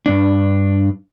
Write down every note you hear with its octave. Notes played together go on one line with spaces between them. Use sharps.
G2 D4